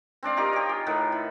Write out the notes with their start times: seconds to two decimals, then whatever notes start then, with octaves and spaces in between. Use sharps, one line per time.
0.23 C4 D4 D5 F5
0.37 D#4 F4 G4 A#4
0.53 G4 C#5
0.69 G#4
0.87 A2 D#3 B4
1.12 E4